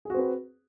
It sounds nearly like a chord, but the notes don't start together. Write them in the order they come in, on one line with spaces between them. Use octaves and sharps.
G#4 F#4 C4 B4